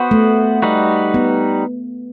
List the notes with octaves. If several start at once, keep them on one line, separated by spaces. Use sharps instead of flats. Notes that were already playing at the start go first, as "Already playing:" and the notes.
Already playing: B3 F#4 C5
A3
G3 D#4 F#4 B4
B3